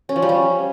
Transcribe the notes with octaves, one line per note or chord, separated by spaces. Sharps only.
C#4
F3
G3
C#4